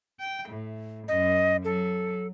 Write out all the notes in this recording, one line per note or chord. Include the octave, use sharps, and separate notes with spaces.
G5
A2
F#2 D#5
F#3 A4